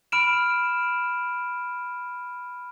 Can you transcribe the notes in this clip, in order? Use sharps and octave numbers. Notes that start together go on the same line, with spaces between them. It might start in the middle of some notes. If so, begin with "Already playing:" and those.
B5 F6 D7 E7